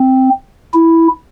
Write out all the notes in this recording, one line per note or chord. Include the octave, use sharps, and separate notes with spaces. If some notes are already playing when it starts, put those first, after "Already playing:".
Already playing: C4
E4